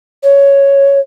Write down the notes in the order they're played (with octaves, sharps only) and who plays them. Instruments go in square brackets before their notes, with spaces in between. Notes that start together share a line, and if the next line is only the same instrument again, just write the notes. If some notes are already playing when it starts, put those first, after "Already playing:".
[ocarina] C#5